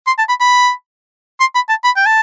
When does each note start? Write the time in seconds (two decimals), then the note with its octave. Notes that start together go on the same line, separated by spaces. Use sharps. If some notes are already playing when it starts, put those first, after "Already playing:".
0.07 C6
0.18 A5
0.29 B5
0.40 B5
1.40 C6
1.55 B5
1.69 A5
1.84 B5
1.96 G5
2.06 A5